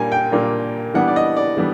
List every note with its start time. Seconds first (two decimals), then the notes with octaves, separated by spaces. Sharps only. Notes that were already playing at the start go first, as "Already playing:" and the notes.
Already playing: A#2 G3 A#3 D4 G#5
0.12 G5
0.32 A#2 G3 A#3 D4
0.94 E3 G3 B3 D4 F#5
1.08 D5
1.16 D#5
1.37 D5
1.57 E3 G3 B3 D4